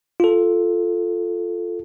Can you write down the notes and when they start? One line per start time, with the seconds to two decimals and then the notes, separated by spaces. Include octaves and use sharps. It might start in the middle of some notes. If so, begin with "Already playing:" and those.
0.20 F4 A4